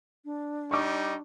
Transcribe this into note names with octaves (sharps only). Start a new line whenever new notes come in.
D4
G3 D#4 C#6 D6